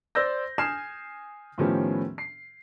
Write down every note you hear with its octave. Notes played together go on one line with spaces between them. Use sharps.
C5 D5 E6 G6 A#6
G#5 D#6 F6 G#6 C7 E7
A2 D#3 F3 B3 C#4 G4
C7